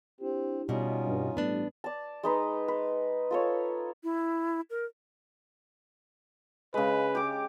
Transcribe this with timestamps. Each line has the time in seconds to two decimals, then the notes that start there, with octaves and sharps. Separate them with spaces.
0.20 C4 D4 E4 G4
0.69 B2 G3 C#4 D#4 F4
1.07 G2
1.37 A1 G2 B3 D4
1.84 D5 A5
2.23 G#3 D#4 B4
2.68 B4
3.31 F4 A4 C#5
4.04 E4
4.70 A#4
6.74 C#3 G#3 B4
7.15 G4 D6